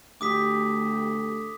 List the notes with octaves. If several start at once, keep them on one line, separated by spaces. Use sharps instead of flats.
D2 A3 G4 D6 D#6 B6